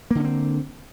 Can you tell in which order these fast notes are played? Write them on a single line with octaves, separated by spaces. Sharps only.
A#3 D3 C#4 C4